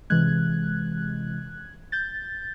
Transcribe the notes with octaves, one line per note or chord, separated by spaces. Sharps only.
C3 E3 G#3 F#6 G#6
G6 A6